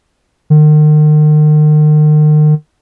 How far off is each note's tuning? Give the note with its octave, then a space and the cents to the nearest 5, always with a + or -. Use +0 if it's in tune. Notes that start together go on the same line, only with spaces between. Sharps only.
D#3 -40